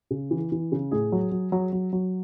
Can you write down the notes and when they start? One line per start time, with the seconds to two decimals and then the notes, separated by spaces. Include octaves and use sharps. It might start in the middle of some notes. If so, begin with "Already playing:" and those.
0.11 C#3
0.31 E3
0.52 E3
0.72 C#3
0.91 A2 G#4
1.12 F#3
1.32 F#3
1.52 F#3
1.73 F#3
1.93 F#3